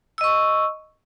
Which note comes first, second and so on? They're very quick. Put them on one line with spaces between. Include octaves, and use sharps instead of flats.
E6 D#5 C#6